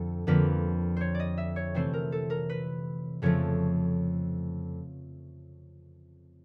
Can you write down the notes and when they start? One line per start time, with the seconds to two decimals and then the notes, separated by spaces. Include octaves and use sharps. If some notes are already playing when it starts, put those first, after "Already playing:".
Already playing: F2 D3 F3 A4
0.27 F2 D3 F3 A#3 B4
0.97 C5 C#5
1.15 D5
1.20 D#5
1.38 E5
1.56 C#5
1.75 C3 E3 A3 C4 C5
1.94 A#4
2.12 A4
2.30 A#4
2.50 B4
3.22 F2 C#3 F3 A3 C#5